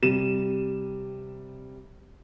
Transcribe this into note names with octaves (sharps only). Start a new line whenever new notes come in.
C3 G3 D#7 E7